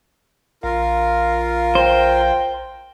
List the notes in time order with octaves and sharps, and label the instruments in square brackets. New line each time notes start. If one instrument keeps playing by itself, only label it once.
[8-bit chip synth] A#1 F5 [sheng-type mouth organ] F4 A#4
[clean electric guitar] C5 [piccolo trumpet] G5